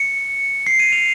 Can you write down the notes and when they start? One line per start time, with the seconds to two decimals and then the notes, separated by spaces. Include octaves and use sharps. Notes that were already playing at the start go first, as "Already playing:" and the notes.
Already playing: C#7
0.67 C7
0.80 D#7
0.92 F7